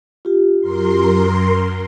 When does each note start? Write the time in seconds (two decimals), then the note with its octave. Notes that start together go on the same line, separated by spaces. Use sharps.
0.25 F4 G4
0.60 F#2 A#4 C6